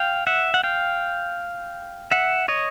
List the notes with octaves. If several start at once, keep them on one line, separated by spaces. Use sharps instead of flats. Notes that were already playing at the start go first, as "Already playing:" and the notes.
Already playing: F5 G5
E5 F#5
F#5
F5 G5
E5 F#5
C#5 D#5